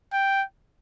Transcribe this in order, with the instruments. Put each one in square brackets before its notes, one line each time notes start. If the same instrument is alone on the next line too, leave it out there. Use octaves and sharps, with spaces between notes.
[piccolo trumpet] G5